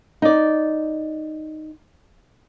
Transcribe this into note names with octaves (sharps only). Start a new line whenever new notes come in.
D#4 D5